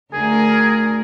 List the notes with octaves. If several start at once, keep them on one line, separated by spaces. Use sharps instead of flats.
D2 G#4 A#4